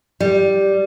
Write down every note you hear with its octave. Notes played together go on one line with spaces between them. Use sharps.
G3